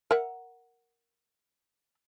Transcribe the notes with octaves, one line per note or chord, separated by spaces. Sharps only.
A#4 E5 F#5